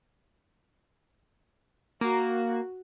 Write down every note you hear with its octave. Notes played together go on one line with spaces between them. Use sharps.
A#3 F#4